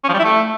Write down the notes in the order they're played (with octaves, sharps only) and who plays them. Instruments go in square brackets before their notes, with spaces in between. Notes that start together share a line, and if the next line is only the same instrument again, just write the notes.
[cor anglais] C#4
F3
G3
E4
A3